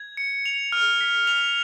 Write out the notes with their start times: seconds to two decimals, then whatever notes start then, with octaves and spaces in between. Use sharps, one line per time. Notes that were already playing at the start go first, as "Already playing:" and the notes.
Already playing: G#6
0.17 C#7
0.46 F7
0.72 F6
1.01 B6
1.27 F7